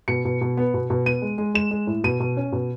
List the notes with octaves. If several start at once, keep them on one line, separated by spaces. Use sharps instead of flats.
B2 C#7
B2
B2
B3
B2
B2
B3 D#7
G#3
G#3
G#3 E7
G#3
A2
B2 D#7
B2
C#4
B2